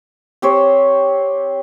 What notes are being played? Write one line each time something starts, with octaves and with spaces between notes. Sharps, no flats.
C4 G4 C5 C#5